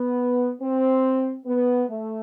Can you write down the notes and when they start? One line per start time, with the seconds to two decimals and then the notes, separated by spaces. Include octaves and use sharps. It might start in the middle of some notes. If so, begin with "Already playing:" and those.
Already playing: B3
0.61 C4
1.46 B3
1.89 A3